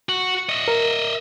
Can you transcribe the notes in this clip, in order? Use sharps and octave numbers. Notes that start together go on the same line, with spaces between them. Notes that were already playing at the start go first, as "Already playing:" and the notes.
F#4
D#5 E5
A#4